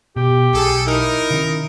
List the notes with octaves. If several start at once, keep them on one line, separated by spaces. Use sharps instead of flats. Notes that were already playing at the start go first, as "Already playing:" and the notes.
B2 G4
B1 G#4 A4
D#4 E4 A#4
C3 D#3 C#4